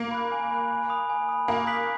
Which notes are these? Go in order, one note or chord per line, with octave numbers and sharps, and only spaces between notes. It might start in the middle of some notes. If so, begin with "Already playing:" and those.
Already playing: A#3
B5 F#6
G#5
B5 F#6
G#5
B5 D#6
G#5
B5 D#6
A#3 A#5
D#6 F#6 B6 F#7